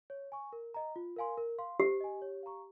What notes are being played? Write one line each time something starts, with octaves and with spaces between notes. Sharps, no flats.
C#5
G#5 C#6
A#4
D#5 A#5
F4
A#4 F5 G#5 C6
A#4
F5 C6
G4 C5
D#5 G#5
C#5
F5 A#5 C#6